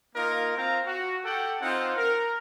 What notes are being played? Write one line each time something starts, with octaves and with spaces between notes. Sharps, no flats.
A#3 D#4 F4 A#4
C4 F4 F5 A#5
F#4
G4 A4 F#5 G5
C4 D#4 F4 F#5
A#4